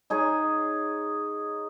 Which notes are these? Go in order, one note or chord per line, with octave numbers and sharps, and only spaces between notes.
D#4 G#4 C#5